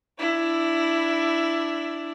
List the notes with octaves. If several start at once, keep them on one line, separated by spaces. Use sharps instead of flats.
D4 E4